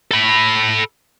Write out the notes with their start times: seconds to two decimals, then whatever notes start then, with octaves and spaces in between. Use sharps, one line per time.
0.11 A4 B5